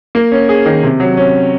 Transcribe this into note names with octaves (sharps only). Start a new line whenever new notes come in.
A#3
C#4
G#4
D#3
C3
F#3
C#4